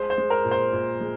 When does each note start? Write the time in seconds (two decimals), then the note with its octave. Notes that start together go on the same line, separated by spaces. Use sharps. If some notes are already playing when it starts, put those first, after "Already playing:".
Already playing: G#3 C5
0.10 C5
0.17 G#3
0.30 A#4
0.45 A#2
0.51 C5
0.73 A#2
1.00 G#3